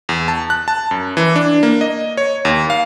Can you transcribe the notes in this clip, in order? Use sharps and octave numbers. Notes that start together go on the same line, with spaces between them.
E2
A5
F#6
A5
F#2
E3
D4
A#3
D#5
C#5
D#2
F5